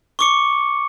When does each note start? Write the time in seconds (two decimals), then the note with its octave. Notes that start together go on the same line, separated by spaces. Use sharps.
0.19 C#6 D6 C#7